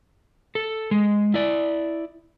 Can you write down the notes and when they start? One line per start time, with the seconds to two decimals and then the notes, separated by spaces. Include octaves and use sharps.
0.55 A4
0.91 G#3
1.34 E4 D5